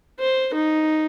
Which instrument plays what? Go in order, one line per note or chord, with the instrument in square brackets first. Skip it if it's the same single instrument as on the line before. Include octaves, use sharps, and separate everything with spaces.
[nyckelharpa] C5
D#4